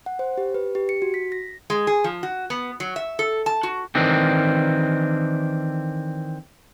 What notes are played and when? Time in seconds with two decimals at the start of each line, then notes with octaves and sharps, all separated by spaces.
0.06 F#5
0.19 C5
0.38 G4
0.54 B4
0.75 G4
0.89 C#7
1.02 F#4
1.14 B6
1.32 A#6
1.70 G#3
1.87 G#4
2.04 F3
2.23 F#4
2.50 B3
2.80 F#3
2.96 E5
3.19 A4
3.46 A5
3.63 F#4
3.95 D#3 E3 C4 D4